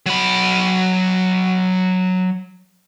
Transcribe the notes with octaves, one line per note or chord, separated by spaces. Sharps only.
F#3 B5